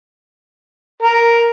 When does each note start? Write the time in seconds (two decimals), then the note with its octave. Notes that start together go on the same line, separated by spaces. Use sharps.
1.02 A#4